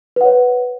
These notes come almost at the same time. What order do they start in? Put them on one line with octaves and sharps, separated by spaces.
B4 F#5 C#5